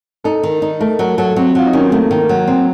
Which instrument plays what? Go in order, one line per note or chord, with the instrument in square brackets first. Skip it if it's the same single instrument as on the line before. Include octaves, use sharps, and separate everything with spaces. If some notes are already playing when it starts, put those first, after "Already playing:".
[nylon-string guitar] D#4 [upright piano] A4
[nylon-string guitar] D#3
D#4
[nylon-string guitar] A3 [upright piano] A#4
[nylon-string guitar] F#3 [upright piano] A#4
[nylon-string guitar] F#3 [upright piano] A4
[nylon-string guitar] F#3 [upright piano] C4
[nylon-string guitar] F#3 [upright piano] F4
[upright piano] D#4
[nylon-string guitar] D#3 [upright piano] C#4
[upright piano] C4
[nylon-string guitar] A3 [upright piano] A#3
[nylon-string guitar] D#3
F#3
C4